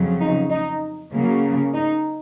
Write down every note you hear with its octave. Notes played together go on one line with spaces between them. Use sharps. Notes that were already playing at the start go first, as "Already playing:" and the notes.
Already playing: F2 C#3 F#3
D#4
D#4
C#3 F#3 A#3
D#4